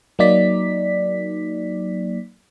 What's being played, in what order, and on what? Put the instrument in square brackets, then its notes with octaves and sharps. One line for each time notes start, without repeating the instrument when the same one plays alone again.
[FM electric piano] F#3 A#3 D#4 D5 B6